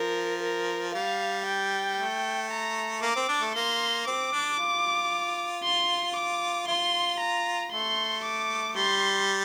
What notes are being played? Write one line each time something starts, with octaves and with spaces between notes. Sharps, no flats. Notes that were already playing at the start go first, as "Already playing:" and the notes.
Already playing: F3 A#4
A#4
G3 F5
G5
A3
A#5
A#3 D6
C4
D4
A3
A#3 C6
C4 D6
D4
F4
C6
D6
F4 C6
A#5
A3 C6
D6
G3 C6